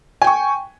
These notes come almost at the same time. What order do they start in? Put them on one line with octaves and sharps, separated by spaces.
G#5 G5 C#6